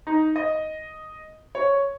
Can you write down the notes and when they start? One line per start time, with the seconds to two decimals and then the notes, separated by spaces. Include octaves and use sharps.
0.07 D#4
0.36 D#5
1.55 C#5